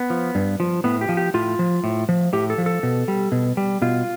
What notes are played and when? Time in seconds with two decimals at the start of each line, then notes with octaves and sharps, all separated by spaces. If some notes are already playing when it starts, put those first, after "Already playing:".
Already playing: B3
0.10 F3
0.35 G2
0.60 F3
0.84 A2 B3
1.01 G4
1.09 F3
1.17 G4
1.34 A2 F4
1.59 F3
1.84 A2
2.09 F3
2.33 A2 G4
2.50 A4
2.58 F3
2.66 A4
2.83 B2
3.08 G3
3.32 B2
3.57 G3
3.82 B2 F4